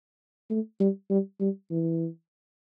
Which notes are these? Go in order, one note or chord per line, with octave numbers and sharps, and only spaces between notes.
A3
G3
G3
G3
E3